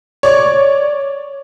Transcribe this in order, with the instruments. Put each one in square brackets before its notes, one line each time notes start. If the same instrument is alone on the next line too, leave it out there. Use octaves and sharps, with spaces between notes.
[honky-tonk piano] C#5 D5